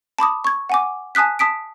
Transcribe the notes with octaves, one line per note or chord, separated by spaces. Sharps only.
A5 B5 D6 D#6
C#6 G#6
F#5 G#5 D6
G#5 A5 D#6 F#6 B6
A5 D#6 B6 D7